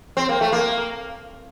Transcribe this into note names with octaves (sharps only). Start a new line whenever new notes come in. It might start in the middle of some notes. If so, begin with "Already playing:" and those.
C4
A#3
A3
A#3